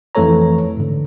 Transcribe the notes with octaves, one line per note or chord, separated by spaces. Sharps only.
F2 E3 A3 A4 C#5 A#5
G#2 D3